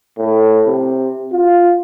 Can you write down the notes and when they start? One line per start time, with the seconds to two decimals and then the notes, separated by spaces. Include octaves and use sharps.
0.18 A2
0.67 C3
1.33 F4